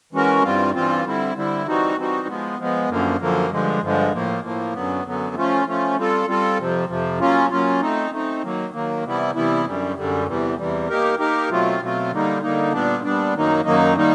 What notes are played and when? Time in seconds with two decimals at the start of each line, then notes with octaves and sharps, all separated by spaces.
0.13 E3 G#3 C#4 F#4 A#4
0.43 G2 E3 G3 C4 F4
0.74 G2 E3 G3 C4 F4
1.05 D3 G3 C4 E4
1.36 D3 G3 C4 E4
1.66 E3 G3 C4 D#4 F#4
1.97 E3 G3 C4 D#4 F#4
2.28 F3 G#3 B3
2.59 F3 G#3 B3
2.89 F#2 D3 F3 A#3
3.20 F#2 D3 F3 A#3
3.51 G2 D3 F3 G#3
3.82 G2 D3 F3 G#3
4.13 A2 F3 A#3
4.44 A2 F3 A#3
4.74 F#2 D3 F#3 B3
5.05 F#2 D3 F#3 B3
5.36 F3 A3 C#4 F4
5.66 F3 A3 C#4 F4
5.97 G3 C4 F4 A4
6.27 G3 C4 F4 A4
6.58 F2 C3 F3
6.89 F2 C3 F3
7.20 F#3 A#3 C#4 F4
7.50 F#3 A#3 C#4 F4
7.81 A3 C4 D#4
8.11 A3 C4 D#4
8.43 D#3 F#3 A#3
8.74 D#3 F#3 A#3
9.04 C3 E3 G3 B3 E4
9.35 C3 E3 G3 B3 E4
9.66 F#2 D3 G3
9.96 F#2 D3 G3
10.27 E2 C3 E3 G3
10.58 E2 C3 E3 G3
10.89 A#3 D#4 G4 A#4
11.19 A#3 D#4 G4 A#4
11.50 B2 F#3 A3 C4 F4
11.81 B2 F#3 A3 C4 F4
12.11 D3 G3 A#3 D#4
12.42 D3 G3 A#3 D#4
12.72 A#2 G3 B3 D4
13.04 A#2 G3 B3 D4
13.35 F#2 D#3 F#3 A#3 D#4
13.65 F#2 D#3 F#3 A#3 D#4
13.96 D#3 G3 A#3 D#4